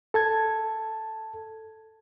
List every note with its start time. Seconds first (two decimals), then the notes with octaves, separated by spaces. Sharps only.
0.14 A4 A5 G#6